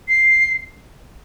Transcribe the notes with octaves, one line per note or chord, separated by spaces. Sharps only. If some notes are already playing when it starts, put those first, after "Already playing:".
C7